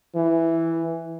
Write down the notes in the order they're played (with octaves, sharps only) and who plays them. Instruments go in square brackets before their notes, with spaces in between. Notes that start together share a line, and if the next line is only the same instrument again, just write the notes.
[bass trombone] E3